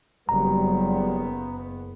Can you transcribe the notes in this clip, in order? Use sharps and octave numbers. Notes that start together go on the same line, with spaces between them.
F#1 F#3 G3 B3 A#5